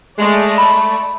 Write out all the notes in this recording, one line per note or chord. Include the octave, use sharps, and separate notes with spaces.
G#3 A3 D5
B5